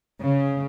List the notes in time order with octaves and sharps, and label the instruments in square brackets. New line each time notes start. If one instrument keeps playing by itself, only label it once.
[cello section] C#3